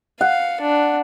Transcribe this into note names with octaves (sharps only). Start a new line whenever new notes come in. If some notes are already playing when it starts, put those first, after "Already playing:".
F5 F#5
D4